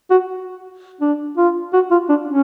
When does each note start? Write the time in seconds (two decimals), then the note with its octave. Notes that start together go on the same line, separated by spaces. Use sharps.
0.10 F#4
1.01 D4
1.37 F4
1.73 F#4
1.91 F4
2.09 D4
2.28 C#4